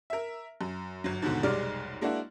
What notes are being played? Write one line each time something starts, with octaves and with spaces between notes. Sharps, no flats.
A#4 E5
F#2
G1 F#3
D#2 G#2 B2 D3
F1 B1 G3 G#3 D5 F6
G#3 A#3 D4 E4 F#4